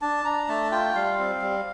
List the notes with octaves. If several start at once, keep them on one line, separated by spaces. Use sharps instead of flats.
D4 A5
D4 A#5
A3 A5
F4 G5
G3 F5
C4
G3